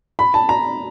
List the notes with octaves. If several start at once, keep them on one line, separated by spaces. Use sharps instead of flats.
B5
A5
A#5